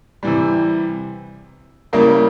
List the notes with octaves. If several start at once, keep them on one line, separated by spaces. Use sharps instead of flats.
C3 E3 G3
C#3 G3 A#3 E4 A#4